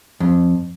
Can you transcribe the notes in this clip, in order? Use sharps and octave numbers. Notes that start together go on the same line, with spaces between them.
F2